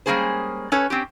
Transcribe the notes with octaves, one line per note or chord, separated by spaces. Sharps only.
G3 G#3 A#3 C#4 G#4 C5
C#4 A4 B4 C#5
C4 C#4 G4